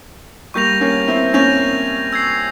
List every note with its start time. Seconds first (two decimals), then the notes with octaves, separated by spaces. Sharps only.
0.54 G3 A#3 C#6 G6 A#6 F7
0.81 A#3 C#4
1.07 C4 E4
1.34 A#3 C#4 C#6 G6 A#6 F7
2.13 E6 G#6 C7